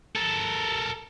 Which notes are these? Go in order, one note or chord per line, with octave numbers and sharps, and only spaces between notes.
A4 A#4